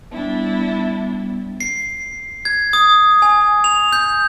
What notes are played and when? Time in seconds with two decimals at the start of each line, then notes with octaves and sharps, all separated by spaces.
0.11 G3 B3 D4 E4
1.61 C7
2.45 G#6
2.73 D#6
3.22 G#5
3.64 F7
3.92 G6